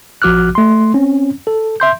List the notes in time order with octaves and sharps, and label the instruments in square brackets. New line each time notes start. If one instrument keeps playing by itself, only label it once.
[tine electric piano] A#1 F3 F#4 D6 F6 F#6
A3 C6
C4 C#4
A4
E5 C6 G6